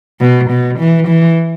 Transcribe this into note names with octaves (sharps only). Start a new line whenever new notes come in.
B2
B2
E3
E3